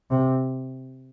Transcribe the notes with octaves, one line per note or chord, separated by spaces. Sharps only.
C3